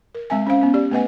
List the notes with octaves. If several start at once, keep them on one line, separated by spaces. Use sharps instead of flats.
A#4
G#3 C4 E5 G#5
C#4 C5 F5
B3 C#4
G4 D5
A3 B3 B4 D#5 F#5 G#5